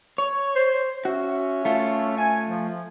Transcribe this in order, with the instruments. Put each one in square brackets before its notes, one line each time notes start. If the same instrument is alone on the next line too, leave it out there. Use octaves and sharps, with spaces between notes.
[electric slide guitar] C#5
[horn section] C5
[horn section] C#4 E5 [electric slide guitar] F#4
[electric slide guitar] A3 F4
[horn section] G#5
F3